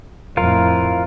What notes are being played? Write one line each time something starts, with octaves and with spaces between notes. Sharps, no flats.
F2 A2 F4 A#4 F5